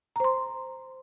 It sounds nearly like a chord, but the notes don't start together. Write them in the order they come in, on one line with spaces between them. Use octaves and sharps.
A#5 C5 C6